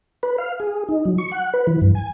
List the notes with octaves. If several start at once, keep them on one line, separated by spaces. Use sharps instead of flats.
B4
F5
G#4
D#4
F#3
C#6
F#5
B4
E3
G2
G#5